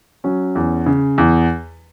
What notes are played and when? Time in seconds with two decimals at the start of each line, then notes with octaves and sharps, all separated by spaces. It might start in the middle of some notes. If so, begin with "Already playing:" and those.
0.24 F#3 C#4
0.55 E2
0.86 C#3
1.18 E2